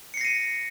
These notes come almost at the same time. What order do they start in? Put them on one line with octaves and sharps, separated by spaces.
C#7 C7 A#6 D#7